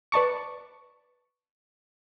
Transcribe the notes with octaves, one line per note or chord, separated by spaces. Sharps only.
B4 D5 A5 C#6